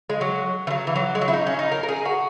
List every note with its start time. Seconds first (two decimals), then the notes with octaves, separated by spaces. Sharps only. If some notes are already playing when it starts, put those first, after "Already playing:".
0.10 G#3
0.21 F#3
0.67 E3
0.70 F#3
0.87 E3
0.96 F#3
1.15 G#3
1.21 F#3
1.28 E4
1.33 D#4
1.47 C#4
1.59 D#4
1.72 A#4
1.83 A#4
1.89 G#4
2.05 F#4